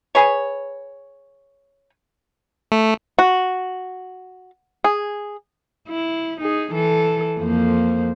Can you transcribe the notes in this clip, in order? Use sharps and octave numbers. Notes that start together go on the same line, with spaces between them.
G#4 B4 C#5
A3
F#4
G#4
E4
D#4 G#4
E3 A4
F2 A#3 C5